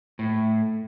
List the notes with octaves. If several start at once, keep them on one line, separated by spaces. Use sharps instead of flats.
A2